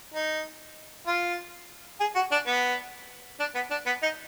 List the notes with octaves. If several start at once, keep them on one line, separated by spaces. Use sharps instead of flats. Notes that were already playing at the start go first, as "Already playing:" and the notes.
D#4
F4
G#4
F#4
D4
B3
D4
B3
D4
B3
D#4